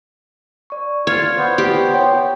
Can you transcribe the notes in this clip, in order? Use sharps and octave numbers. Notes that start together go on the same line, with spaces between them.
D5 C#6
F4 C#5
B3 C5
G4
C#5 G5